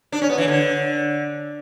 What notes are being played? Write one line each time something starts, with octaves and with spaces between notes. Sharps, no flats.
D4
C#4
B3
E3
D3